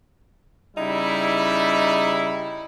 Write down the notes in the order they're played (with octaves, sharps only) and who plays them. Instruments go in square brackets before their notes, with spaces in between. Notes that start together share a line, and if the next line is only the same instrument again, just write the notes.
[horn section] C#3 G3 D#4 E4